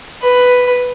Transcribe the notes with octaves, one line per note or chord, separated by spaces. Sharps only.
B4